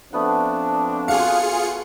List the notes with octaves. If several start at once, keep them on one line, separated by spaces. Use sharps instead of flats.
F3 A3 B3 C4 D4 F#5
F4 F#4 G#4 F5 C#7